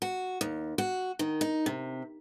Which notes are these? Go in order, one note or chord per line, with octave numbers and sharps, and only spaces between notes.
F#4
D#2
F#4
D#3
D#4
C3